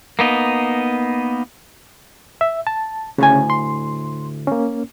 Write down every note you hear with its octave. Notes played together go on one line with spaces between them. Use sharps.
A#3 B3 D#4
E5
A5
D2 A2 C#3 C#4 G#5
C6
A#3 C#4